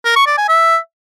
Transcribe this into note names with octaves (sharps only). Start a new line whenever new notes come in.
A#4
C#6
D5
G#5
E5